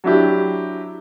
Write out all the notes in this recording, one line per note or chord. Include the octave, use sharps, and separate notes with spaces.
F#3 D4 E4 G4